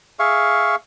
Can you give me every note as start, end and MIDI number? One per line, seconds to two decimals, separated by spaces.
0.19 0.76 68
0.19 0.76 76
0.19 0.76 77
0.19 0.76 85